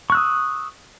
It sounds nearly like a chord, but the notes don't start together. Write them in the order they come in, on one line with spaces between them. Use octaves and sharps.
C#6 F#6 E6 D#6